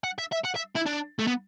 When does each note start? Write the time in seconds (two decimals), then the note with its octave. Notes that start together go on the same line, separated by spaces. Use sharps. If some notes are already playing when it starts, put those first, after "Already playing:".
0.04 F#5
0.19 E5
0.32 E5
0.45 F#5
0.56 E5
0.76 E4
0.86 D4
1.19 A3
1.27 B3